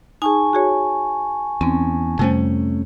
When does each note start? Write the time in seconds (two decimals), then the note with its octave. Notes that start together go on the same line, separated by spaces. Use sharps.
0.22 D#4 G#4 G#5 A5 C#6
0.53 F#4 G#4 C#5
1.61 E2 C4 C#4
2.19 F2 C3 G3 A3 C#4 C5